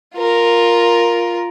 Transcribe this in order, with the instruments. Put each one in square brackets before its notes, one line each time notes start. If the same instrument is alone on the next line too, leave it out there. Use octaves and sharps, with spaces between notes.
[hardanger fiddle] F4 A#4